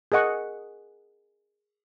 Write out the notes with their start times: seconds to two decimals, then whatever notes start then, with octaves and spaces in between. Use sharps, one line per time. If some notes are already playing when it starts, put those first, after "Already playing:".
0.12 G#4 A#4 D#5 F#5 C#6